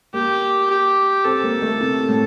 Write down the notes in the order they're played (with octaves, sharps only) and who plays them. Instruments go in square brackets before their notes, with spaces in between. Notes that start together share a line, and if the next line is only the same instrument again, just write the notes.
[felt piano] A#3 [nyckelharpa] G4
[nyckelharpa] G4
[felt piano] C4 [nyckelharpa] A4
[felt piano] A#3
A3
C3
A2